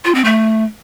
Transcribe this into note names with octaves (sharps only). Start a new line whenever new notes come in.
F4
C4
A3